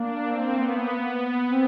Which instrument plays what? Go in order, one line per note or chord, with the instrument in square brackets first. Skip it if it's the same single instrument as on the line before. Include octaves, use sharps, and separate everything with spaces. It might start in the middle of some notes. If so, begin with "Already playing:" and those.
Already playing: [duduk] A#3 [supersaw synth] D4
[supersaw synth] C4
B3
[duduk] C4